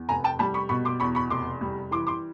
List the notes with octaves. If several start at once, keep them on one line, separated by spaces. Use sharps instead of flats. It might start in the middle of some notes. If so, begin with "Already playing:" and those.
Already playing: E2
F1 G#5 A#5
G5 A5
G3 A5 B5
B5 C#6
B2 B5 C#6
C6 D6
E2 B5 C#6
B5 C#6
F1 C6 D6
G3
E3 C6 D6
C6 D6